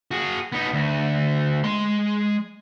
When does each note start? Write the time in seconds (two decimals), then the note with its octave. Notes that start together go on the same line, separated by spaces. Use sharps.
0.11 F#4 G#4
0.52 B3 D#4
0.73 D2
1.64 G#3 C6